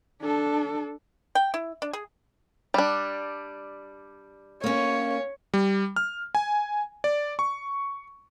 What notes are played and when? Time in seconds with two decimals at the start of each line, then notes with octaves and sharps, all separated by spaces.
0.21 D4 A4
1.35 G5
1.54 E4
1.82 D4
1.93 G#4
2.74 G3 D4
4.64 A#3 C#4 C#5
5.54 G3
5.96 F6
6.35 G#5
7.04 D5
7.39 C#6